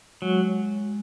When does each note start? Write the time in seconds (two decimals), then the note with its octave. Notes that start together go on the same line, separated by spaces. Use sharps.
0.22 F#3 G#3